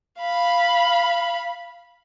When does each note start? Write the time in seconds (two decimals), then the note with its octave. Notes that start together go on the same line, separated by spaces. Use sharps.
0.20 F5 B5